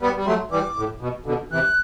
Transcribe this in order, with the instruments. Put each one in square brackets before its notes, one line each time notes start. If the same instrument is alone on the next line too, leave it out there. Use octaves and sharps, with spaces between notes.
[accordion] G3 B3 [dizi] B5
[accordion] G3
[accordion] F#3 A3 [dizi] C6
[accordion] E3 G3 [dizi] D6
[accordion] A2
B2
B2 D3
[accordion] C3 E3 [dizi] F#6